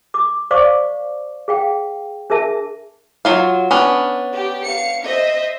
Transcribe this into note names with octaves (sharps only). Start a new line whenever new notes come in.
D6
C5 D5 F5 C#6 D6
G#4 F5 G5
D4 G#4 A#4 E5 A5
F#3 F4 F5
B3 C#4 D4
G4
F5 C#7
C5 D#5 E5